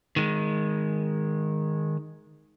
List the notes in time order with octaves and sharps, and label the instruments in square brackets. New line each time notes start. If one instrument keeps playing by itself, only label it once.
[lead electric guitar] D#3 G#3